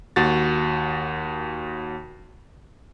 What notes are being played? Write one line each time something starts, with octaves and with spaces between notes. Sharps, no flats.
D#2 F#4 A6